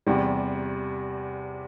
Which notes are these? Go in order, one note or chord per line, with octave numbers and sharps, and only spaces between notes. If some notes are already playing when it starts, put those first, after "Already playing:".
E2 C3 G3